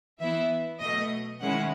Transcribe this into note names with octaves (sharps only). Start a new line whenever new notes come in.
E3 B3 E4 E5
B2 F#3 A3 D#5
D#3 G#3 C#4 E4 F#5